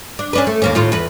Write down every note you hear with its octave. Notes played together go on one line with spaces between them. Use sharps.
D4
C#4 D4 B4
A3
D#2 A#3 C#4
D#2 A2 F4
E2 B4